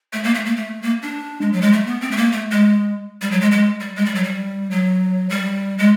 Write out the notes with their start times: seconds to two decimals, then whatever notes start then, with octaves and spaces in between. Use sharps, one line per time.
0.13 A3
0.24 A#3
0.35 A3
0.45 A#3
0.56 A3
0.82 A#3
1.02 D4
1.41 G#3
1.52 F#3
1.62 G#3
1.72 A3
1.87 B3
2.01 C4
2.11 A3
2.17 A#3
2.32 A3
2.51 G#3
3.22 G3
3.31 F#3
3.41 G#3
3.51 G#3
3.81 G3
3.96 G#3
4.05 G3
4.15 F#3
4.24 G3
4.71 F#3
5.30 G3
5.78 G#3